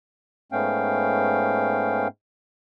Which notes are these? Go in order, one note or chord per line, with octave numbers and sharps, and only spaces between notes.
G#2 A3 B3 C#4 F5 G5